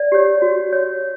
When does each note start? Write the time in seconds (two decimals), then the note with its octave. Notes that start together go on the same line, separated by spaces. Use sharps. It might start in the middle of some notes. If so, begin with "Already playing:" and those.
Already playing: D5
0.12 G4 C#5
0.42 F#4
0.73 C#5